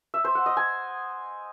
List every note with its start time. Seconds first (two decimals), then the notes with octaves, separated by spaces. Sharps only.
0.14 E5
0.24 C5
0.35 F#5
0.46 D#5
0.57 G#5